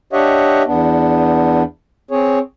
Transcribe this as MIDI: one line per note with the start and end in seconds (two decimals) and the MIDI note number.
0.13 0.63 62
0.13 0.63 67
0.13 0.63 73
0.13 0.63 75
0.13 0.63 76
0.13 0.63 78
0.66 1.63 40
0.66 1.63 59
0.66 1.63 62
2.11 2.39 60
2.11 2.39 68
2.11 2.39 73